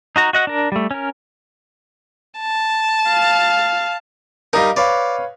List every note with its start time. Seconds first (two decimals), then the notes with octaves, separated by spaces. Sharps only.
0.16 D#4 F#4 A#5
0.33 F#4 D#5 F#5
0.47 D4 A#4
0.72 G3 A3
0.91 C#4 A#4
2.40 A5
3.09 F5
4.53 G3 D#4 A#4 D#5 F5
4.76 B4 C#5 D5 F5